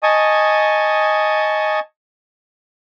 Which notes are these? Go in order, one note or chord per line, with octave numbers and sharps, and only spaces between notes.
D#5 G#5 A5 C#6 D#6